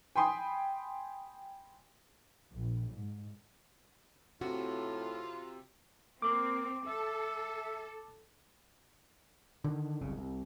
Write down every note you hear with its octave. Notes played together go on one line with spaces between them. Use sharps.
G5 G#5 B5 C6 D#6
A#1
G#2
A2 C3 F4 F#4
A#3 C4 D6
A4 E5
D3 D#3
F#1 C2 C#3
C2